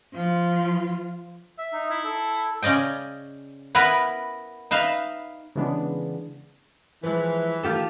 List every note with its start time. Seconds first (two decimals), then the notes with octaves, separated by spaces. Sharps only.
0.13 F3 F4
1.58 E5
1.72 D#4
1.90 E4
2.04 A4
2.63 C#3 C#4 D5 D#5 G5
3.75 B3 E4 A#4 B4
4.71 D#4 B4 E5 F5
5.56 C#3 E3 G#3 B3 D4
7.03 E3 F3 G#3 B4
7.63 D#3 A3 F4 G4 A4